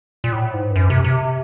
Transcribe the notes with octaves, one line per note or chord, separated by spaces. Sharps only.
A#2
A2
G#2
G2
F#2
C3
C3